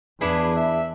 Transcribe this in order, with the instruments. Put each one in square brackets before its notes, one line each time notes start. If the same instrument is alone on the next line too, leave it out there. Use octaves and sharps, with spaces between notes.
[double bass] E2 [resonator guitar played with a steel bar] D4 E4 G#4 [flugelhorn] B4
[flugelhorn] E5